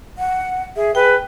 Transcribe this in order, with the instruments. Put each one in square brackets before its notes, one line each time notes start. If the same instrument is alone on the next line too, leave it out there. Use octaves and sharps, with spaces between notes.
[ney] F#5
[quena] G#4 [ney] E5
[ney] G#4 [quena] B4 [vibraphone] G5